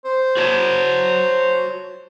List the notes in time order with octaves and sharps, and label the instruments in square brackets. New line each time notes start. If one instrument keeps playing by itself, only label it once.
[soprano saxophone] C5
[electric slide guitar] F#4 C#5 A5